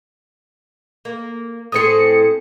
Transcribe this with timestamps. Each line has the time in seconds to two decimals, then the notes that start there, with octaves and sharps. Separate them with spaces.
1.05 A#3
1.72 A2 C4 G#4 D#6 C#7